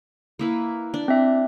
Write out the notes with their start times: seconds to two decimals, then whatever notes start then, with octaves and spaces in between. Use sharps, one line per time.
0.39 A#3 E4 B4
0.94 D4
1.08 C4 E5